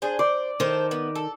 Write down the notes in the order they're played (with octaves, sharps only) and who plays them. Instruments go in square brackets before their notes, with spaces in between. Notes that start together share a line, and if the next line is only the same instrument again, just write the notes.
[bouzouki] D4 G#4 C5
[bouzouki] C5 [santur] D5
[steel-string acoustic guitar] D#3 [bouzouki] A4 C5
[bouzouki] B3
A4